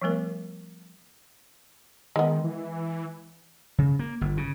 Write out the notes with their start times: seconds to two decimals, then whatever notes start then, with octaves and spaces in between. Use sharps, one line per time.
0.01 F3 G3 A3 B3 A#4
2.16 D#3 G#3 B3
2.44 E3
3.78 C#3
3.99 A#3
4.21 G1
4.37 C#3